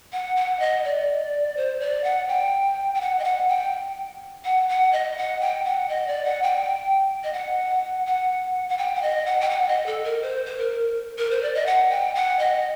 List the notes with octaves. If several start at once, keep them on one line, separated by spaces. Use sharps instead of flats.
F#5
F#5
D#5
D5
C5
D5
F#5
G5
G5
F#5
D#5
F#5
G5
F#5
F#5
D#5
F#5
G5
F#5
D#5
D5
F#5
G5
D#5
F#5
F#5
F#5
G5
F#5
D#5
F#5
G5
F#5
D#5
A4
A#4
C5
C5
A#4
A#4
C5
D5
D#5
F#5
G5
F#5
D#5